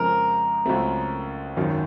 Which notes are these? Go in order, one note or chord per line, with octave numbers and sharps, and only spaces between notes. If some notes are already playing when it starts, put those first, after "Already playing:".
Already playing: F2 C#3 F3 G#3 C4 A#4
C#2 C#3 F#3 A3 C4
G#1 F#2 D#3 F#3